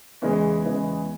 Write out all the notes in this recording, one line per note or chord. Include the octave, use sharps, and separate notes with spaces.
E2 C#3 E3 G#3
E2 C#3 E3 G#3